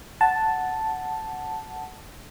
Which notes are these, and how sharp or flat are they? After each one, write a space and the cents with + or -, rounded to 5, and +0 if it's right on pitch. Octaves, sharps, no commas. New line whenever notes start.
F#5 +0 A5 +0